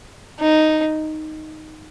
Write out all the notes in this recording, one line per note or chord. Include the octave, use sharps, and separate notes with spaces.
D#4